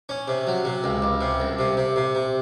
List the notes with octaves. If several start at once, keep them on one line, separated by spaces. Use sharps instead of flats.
C#4
C3
F#3
C3
C#2
C#2
C3
C2
C3
C3
C3
C3